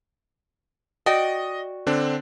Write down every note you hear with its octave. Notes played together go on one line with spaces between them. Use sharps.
F#4 D5 D#5 G5
D3 C4 D4